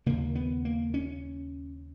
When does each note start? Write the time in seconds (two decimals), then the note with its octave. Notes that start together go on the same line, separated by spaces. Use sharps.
0.06 D#2 C#3 A#3
0.35 B3
0.65 A#3
0.94 C#4